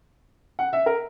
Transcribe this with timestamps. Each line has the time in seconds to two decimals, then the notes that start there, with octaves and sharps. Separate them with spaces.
0.59 F#5
0.73 E5
0.86 A#4